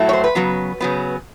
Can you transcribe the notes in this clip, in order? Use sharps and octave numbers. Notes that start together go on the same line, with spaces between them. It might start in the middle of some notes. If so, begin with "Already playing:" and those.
Already playing: A2 F#3 A3
C#5
C5
B4
C#3 F#3 B3
C#3 F#3 B3